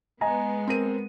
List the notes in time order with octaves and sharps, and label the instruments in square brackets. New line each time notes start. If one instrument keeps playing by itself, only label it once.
[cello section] G#3 B3 [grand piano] D#5 G#5 A#5
[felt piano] C4 A#4 D#7